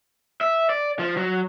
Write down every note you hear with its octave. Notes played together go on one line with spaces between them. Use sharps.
E5
D5
F3
F#3